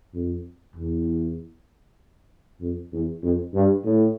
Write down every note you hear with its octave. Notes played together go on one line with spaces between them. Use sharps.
F2
E2
F2
E2
F2
G2
A2